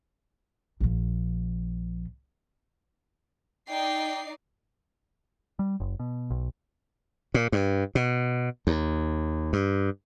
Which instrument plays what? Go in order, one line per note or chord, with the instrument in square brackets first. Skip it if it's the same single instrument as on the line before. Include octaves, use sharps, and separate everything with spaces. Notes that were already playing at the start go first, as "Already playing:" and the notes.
[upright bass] A#1 F3
[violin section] D#4 D5 C7 [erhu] G5
[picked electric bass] G3
F#1
B2
B1
[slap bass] A#2
G2
B2
D#2
G2